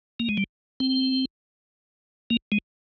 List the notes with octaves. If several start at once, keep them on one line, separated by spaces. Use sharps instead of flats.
A#3
G#3
G3
C4
A#3
G#3